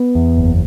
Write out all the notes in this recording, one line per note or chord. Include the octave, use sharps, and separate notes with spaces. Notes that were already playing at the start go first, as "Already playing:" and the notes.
Already playing: B3
E2
F#1